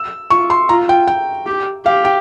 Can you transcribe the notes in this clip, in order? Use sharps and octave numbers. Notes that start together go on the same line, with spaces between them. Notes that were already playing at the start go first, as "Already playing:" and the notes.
Already playing: E6
F4 C#6
C6
F4 A#5
G5
G5
G4
G4 F5
G5